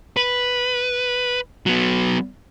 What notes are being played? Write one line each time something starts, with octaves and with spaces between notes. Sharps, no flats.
B4
F#3 B3